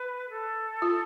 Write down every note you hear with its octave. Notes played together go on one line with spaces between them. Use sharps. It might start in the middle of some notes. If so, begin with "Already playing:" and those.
Already playing: B4
A4
F4